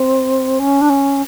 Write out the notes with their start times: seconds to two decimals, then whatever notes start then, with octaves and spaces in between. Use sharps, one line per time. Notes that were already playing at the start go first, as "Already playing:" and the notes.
Already playing: C4
0.59 C#4
0.81 D4
0.90 C#4